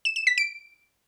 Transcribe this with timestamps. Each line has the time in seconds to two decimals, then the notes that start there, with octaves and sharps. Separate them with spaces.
0.05 E7
0.16 E7
0.27 B6
0.38 D7